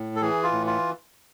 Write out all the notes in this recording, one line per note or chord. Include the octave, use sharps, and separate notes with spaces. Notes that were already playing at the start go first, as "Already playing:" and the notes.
Already playing: A2
A4
E3 G#4
F4
A2
F4